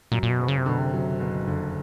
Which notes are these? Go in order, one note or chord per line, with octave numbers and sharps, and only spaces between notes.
F#2 A#2
A#2
B2
F#1
C#3
C3
B2 D3
C3
F#3
F#1 B2
F2 D3